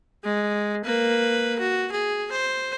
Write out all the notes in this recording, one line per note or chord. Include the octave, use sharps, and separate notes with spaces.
G#3
A#3 B4
F#4
G#4
C5